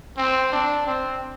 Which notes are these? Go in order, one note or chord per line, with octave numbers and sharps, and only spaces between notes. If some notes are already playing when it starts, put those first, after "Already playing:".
C4
D4
C4